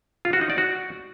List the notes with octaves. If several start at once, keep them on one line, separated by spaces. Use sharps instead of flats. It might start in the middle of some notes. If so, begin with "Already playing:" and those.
F4
F#4
D#4
D5
F#4